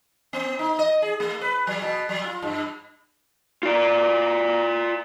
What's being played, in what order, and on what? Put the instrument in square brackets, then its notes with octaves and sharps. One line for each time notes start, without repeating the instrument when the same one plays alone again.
[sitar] B3
D#4
D#5
G#4
A3
B4
F#3
B2
F#3
F4
G2
[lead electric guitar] F4 D5